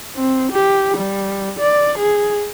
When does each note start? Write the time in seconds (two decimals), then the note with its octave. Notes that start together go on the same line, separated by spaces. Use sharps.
0.16 C4
0.52 G4
0.97 G3
1.59 D5
1.98 G#4